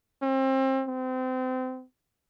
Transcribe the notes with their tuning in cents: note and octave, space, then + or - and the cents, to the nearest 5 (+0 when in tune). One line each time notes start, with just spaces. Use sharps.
C4 +30
C4 -30